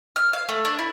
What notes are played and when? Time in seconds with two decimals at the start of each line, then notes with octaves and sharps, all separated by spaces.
0.16 F6
0.33 F5
0.49 A3
0.65 D4
0.79 E4